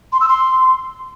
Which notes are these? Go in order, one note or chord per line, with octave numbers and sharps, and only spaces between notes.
C6
E6
C6